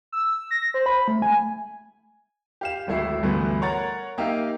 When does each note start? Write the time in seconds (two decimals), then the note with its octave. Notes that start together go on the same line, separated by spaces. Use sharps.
0.12 E6
0.51 A#6
0.74 C5
0.86 B5
1.08 A3
1.22 G#5
2.61 G4 F5 E7
2.87 D1 G#1 A3 E4 C7
3.23 D2 G2 E3 A3 B3
3.61 A#4 C#5 F#5 A#5 A6
4.18 A#3 D#4 G4 E5 F5